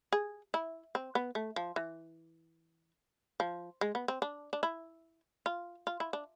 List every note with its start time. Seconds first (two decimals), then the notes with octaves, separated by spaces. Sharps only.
0.12 G#4
0.54 E4
0.95 C4
1.15 B3
1.35 A3
1.56 F3
1.76 E3
3.40 F3
3.81 G#3
3.95 B3
4.08 C4
4.22 D4
4.53 D4
4.63 E4
5.46 F4
5.87 F4
6.00 E4
6.13 D4